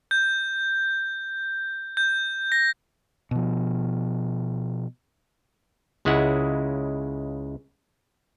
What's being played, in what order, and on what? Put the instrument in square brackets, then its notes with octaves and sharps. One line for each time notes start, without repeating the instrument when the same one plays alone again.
[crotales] G6
G6
A#6
[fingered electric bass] B2 F3
[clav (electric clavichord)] C#2 C#3 G#3 E4 F#5